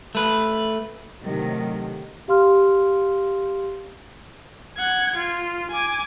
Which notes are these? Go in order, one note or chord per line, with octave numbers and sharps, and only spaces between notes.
A3 B4
A2 C3 D#3 F#3 A3
G4 F5 C6 F6
F#5 G#6
F4
G#5 D6